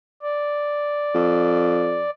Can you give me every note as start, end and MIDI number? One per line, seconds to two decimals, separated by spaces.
0.22 2.10 74
1.15 2.03 41